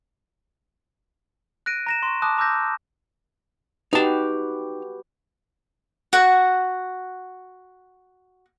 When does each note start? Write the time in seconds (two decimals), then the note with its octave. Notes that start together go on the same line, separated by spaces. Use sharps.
1.66 F#6 A#6 D7 D#7
1.87 A#5 A#6 E7
2.03 C6 C#6
2.22 A5 D6 D#6 F#6
2.38 A#5 D6 E6 F#6 G6 A#6
3.93 D#4 F#4 G4 B4 A5
6.13 F#4 F#5